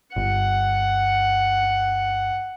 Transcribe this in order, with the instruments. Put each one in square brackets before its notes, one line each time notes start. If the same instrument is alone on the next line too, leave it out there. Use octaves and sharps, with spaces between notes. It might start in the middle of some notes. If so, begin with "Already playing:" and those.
[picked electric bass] G1 [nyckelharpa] F#5